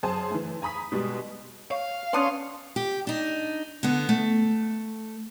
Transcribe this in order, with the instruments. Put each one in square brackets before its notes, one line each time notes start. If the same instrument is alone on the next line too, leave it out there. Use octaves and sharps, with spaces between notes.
[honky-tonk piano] F#2 G#4 C5 G#5 A5
E3 A3
G#5 A#5 B5 D#6 B6
B2 G3 G#3
[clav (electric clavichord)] C#5 [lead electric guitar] F5
[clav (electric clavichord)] B3 D4 C#5 [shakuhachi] C#4 [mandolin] C6 C#6 D#6
[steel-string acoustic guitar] G4
D4 D#4
D3 B3
A3